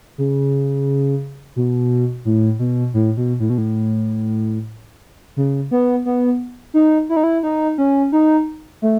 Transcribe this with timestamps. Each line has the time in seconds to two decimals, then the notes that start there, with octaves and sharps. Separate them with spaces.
0.18 C#3
1.56 B2
2.25 A2
2.59 B2
2.94 A2
3.17 B2
3.40 A2
3.50 B2
3.58 A2
5.37 C#3
5.71 B3
6.05 B3
6.74 D#4
7.09 E4
7.16 D#4
7.24 E4
7.43 D#4
7.78 C#4
8.12 D#4
8.82 A3